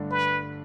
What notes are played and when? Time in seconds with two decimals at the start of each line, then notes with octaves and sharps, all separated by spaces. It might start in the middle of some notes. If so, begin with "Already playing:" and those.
Already playing: G1 G2 D3 A3 D4
0.11 B4